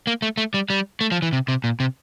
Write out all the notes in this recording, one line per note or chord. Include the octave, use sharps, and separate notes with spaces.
A#3
A3
A3
G3
G3
A3
F3
E3
C3
C3
A#2
C3